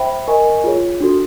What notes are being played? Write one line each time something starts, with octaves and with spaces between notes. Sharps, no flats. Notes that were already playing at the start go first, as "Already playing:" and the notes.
Already playing: C5 E5 G5 B5
A#4 D#5 G#5 C#6
F4 G#4 C#5
D4 F#4 A4